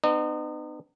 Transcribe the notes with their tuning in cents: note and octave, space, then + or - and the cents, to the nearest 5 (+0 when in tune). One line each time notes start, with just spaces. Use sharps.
B3 +30 D#4 -40 D#5 -40